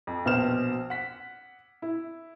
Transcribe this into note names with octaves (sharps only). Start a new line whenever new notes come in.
F2
A#1 B2 C5 F6 E7
F#5 B6
E4